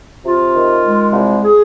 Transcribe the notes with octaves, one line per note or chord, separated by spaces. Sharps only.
C3 F4
D#3
G#3
C2
G#4